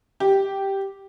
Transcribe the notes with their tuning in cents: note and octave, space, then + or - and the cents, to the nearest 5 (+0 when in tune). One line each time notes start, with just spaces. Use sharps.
G4 -5